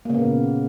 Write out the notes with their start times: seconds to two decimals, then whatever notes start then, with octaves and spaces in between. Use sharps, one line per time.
0.05 A#3
0.10 C#3
0.14 B3
0.18 A#2